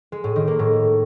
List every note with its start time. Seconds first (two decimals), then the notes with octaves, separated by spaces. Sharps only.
0.12 G#3
0.24 A2
0.36 D#3
0.47 A#3
0.59 A2